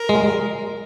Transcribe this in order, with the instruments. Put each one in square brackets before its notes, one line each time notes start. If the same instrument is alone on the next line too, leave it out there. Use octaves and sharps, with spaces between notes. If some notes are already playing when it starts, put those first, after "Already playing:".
Already playing: [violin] A#4
[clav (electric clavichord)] G#3